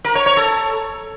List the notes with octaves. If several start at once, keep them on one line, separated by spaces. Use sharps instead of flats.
A#4
C#5
C#5
A4